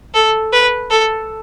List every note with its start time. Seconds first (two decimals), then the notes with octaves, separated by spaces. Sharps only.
0.14 A4
0.52 B4
0.90 A4